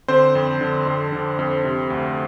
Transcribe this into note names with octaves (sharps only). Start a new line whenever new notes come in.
D3 C4 C5
F2
D3
F2
D3
F2
C3
D2